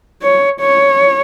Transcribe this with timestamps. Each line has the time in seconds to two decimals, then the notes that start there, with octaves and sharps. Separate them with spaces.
0.22 C#5
0.60 C#5